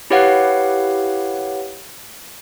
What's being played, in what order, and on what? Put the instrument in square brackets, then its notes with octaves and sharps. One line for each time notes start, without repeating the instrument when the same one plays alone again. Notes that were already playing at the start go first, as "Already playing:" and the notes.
[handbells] E4 G4 B4 C#5 F5 F#5